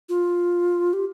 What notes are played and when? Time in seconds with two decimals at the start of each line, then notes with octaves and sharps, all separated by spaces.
0.09 F4
0.93 G4